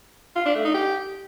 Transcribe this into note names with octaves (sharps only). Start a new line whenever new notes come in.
F4
D4
A3
D#4
G4